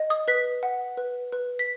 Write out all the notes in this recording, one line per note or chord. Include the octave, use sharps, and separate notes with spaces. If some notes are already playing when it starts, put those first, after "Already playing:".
Already playing: D#5
D#6
B4 B6
F#5
B4
B4
B6